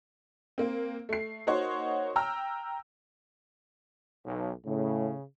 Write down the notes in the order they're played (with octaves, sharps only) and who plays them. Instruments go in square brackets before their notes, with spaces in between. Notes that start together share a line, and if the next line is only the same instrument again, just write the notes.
[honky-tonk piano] A#3 C4
A3 C7
A#3 D#4 F#4 C5 C#5 F#5
G5 A#5 E6 F6
[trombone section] B1
[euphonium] A2 [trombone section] C#3